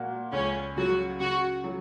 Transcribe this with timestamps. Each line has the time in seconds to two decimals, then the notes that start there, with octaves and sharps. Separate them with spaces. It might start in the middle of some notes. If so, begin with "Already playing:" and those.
Already playing: A#2 A#3 F#4
0.32 C#2 C#4
0.76 C#3 F#3 F#4
1.20 C#3 F#4
1.64 F#3